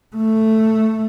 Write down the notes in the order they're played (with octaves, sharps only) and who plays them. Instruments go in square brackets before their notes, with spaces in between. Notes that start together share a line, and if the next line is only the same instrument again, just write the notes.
[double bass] A3